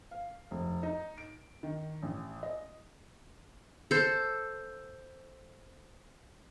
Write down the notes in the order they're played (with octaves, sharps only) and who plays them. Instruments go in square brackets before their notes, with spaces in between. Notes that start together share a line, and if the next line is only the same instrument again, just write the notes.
[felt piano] F5
F1
D#4
D7
D#3
A1
D#5
[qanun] A4 C5